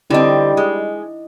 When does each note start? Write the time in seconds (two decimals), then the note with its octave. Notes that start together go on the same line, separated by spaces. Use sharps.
0.10 D3 G3 C4 E4 D#5
0.57 G#3